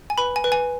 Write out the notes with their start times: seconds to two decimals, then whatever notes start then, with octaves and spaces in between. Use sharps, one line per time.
0.10 G#5
0.18 B4 B5
0.36 G#5
0.44 B4
0.52 G#5